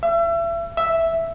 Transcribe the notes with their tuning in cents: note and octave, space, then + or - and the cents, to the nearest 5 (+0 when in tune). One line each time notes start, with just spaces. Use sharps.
E5 +35
E5 +0